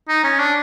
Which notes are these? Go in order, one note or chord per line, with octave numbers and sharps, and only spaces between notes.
D#4
C#4
D4